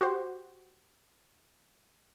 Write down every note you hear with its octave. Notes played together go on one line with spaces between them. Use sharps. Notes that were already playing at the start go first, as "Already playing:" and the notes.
F#4 G4 C5